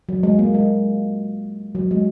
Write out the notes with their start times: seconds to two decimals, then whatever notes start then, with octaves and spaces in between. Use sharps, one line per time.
0.09 F#3
0.23 G#3
0.39 A#3
0.54 G#3
1.75 F#3
1.91 G#3